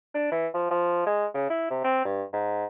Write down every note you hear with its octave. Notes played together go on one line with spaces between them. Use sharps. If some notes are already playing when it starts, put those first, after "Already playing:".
D4
E3
F3
F3
G#3
C#3
E4
C3
C4
G2
G#2